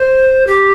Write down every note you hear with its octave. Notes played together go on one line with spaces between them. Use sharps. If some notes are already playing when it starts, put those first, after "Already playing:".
Already playing: C5
G4